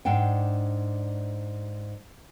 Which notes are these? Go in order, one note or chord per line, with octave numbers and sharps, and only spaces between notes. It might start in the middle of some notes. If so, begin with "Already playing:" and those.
G#2 D4 F#5 G5